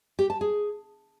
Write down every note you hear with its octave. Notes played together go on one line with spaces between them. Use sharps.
G4
A5
G#4